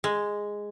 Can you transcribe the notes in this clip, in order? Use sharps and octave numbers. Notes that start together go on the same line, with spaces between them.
G#3